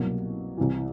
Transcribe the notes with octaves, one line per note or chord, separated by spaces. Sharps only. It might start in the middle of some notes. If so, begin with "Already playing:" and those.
Already playing: C2 B2 F#3 A#3
C2 C3 E3